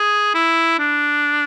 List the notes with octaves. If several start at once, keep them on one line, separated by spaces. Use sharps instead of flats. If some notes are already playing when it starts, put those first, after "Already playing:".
Already playing: G#4
E4
D4